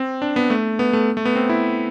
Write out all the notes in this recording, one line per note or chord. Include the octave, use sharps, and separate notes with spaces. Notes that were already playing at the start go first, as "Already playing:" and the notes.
Already playing: C4
D4
B3
A3
B3
A3
A3
B3
C4
E4